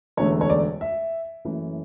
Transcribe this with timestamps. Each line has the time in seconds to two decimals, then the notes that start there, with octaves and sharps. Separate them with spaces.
0.17 E1 E2 D3 A3 C#4 C#5
0.41 C#5
0.50 D5
0.81 E5
1.45 F#1 F#2 E3 A3 C#4